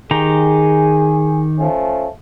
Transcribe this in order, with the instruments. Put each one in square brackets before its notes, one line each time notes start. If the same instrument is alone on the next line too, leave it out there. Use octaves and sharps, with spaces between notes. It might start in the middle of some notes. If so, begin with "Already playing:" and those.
[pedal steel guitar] D#3 G4 A#5 [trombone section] G#4
[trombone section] F3 A3 C#4